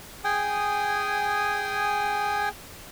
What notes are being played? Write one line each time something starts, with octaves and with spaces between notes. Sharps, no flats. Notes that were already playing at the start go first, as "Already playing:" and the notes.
G#4 G5 G#5 D#6